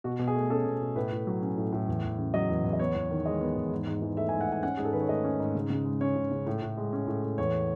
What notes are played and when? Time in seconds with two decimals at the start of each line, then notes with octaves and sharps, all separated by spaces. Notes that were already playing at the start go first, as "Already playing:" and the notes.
0.04 B2 F#4
0.19 B2
0.28 G#4
0.36 A3
0.50 C#4 A4
0.66 B2
0.81 B2
0.96 A2 B4
1.12 A2
1.27 F#3
1.42 C#4
1.57 A2
1.73 A2
1.88 E2
2.03 E2
2.18 C#3
2.34 F#3 D#5
2.49 E2
2.64 E2
2.73 D#5
2.79 B3 C#5
2.95 E2
3.10 D#3
3.25 G#3 D#5
3.41 B3
3.56 E2
3.72 G#2
3.87 G#2
4.02 E3
4.17 A3 E5
4.29 G#5
4.33 G#2
4.41 F#5
4.48 G#2 G#5
4.63 C#4 F#5
4.77 G#2 G#4
4.85 A4
4.93 D#3 B4
5.01 C#5
5.09 A3 D#5
5.24 C#4
5.40 G#2
5.55 C#3
5.70 C#3
5.85 G#3
6.01 C#4 C#5
6.16 C#3
6.31 C#3
6.47 A2
6.62 A2
6.77 G#3
6.93 C#4
7.07 A2
7.23 A2
7.38 E2 C#5